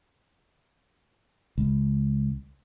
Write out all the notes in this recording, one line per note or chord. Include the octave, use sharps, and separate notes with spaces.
C#2